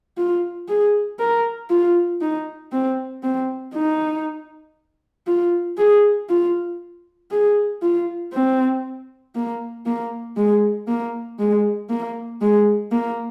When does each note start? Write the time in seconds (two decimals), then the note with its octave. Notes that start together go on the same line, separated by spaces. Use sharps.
0.18 F4
0.69 G#4
1.19 A#4
1.70 F4
2.21 D#4
2.72 C4
3.23 C4
3.74 D#4
5.27 F4
5.78 G#4
6.29 F4
7.31 G#4
7.82 F4
8.33 C4
9.35 A#3
9.86 A#3
10.37 G#3
10.88 A#3
11.39 G#3
11.90 A#3
12.41 G#3
12.92 A#3